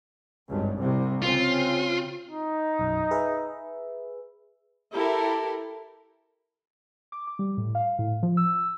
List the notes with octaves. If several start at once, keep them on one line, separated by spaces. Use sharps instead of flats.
G#1 C#2 G2
C2 C3
C#3 C4 F4
D#4
B1 F#2
G#4 B4 E5
E4 G4 A4 A#4
D6
D6
G3
A2
F5
A2
F3
E6